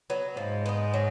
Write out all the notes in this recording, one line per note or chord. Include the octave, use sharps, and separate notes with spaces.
F#3 B3
G#2 F3 G#3
B3 D#4
F#3